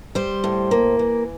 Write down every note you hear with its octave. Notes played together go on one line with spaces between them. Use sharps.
G3 C5
A2
A#3
E3